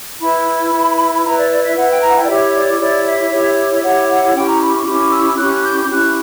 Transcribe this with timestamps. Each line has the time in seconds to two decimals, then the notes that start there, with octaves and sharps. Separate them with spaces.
0.21 E4 B4 B5
0.73 E4 B4
1.24 E4 B4 A#5
1.37 D5
1.50 D5
1.63 E5
1.76 E4 B4 F#5
1.89 G5
2.02 A#5
2.09 F#5
2.15 G5
2.23 D5
2.27 E4 G4 C#5 E5
2.53 D5
2.79 E4 G4 C#5 D5
3.05 E5
3.31 E4 G4 C#5
3.75 E5
3.83 E4 G4 C#5 F#5
4.09 F#5
4.34 C#4 E4 G4 G5
4.48 A#5
4.60 B5
4.73 C#6
4.86 C#4 E4 G4 D6
5.12 E6
5.38 C#4 E4 G4 F#6
5.64 G6
5.79 G6
5.90 C#4 E4 G4 F#6